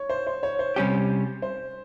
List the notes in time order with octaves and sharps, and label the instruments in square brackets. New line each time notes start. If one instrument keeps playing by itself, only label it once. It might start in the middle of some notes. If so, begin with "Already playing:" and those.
Already playing: [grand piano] C#5
C5
C5
C#5
C5
[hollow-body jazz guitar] C3 G3 C#4 G4
[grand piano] C5